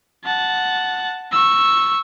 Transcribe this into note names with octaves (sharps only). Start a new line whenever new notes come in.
F#5 A5
C#6 E6